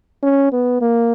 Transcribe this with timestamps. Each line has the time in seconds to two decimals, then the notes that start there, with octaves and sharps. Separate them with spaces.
0.23 C#4
0.52 B3
0.81 A#3